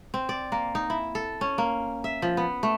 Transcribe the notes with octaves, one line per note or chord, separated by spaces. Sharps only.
C4
D5
A#3
D#4
E4
A4
C#4
A#3
E5
F3
B3
A3